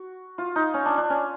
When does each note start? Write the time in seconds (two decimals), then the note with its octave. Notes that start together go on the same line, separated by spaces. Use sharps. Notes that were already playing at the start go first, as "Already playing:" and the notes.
Already playing: F#4
0.38 F4
0.56 D#4
0.74 C#4
0.86 D4
0.98 D4
1.10 C#4